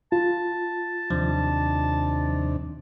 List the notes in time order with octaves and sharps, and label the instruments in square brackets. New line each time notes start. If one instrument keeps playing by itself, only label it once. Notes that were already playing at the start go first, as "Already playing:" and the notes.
[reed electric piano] F4 [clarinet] A5
[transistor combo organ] D#2 C3 D4 [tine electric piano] F3